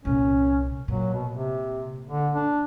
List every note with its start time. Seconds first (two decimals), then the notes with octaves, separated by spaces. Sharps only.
0.05 C2 A#2 C#4
0.88 A#2 F#3
1.13 B2
1.34 C3
2.09 D3
2.35 D4